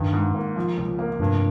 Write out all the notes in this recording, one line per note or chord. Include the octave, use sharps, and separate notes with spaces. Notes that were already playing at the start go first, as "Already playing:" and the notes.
Already playing: G2 D#3
G#2
A#3
F3
C#2
A#3
F1 G2